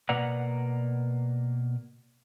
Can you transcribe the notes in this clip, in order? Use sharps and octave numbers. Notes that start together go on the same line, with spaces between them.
B2 A#3 B4 D5 F#5 A#5